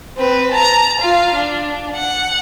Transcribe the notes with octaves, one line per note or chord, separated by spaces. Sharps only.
C4 B4
A5 A#5
F4 F5
D4
F#5